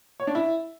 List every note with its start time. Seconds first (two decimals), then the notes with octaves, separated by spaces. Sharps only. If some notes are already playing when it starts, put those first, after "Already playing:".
0.20 C#5
0.27 D4
0.35 E4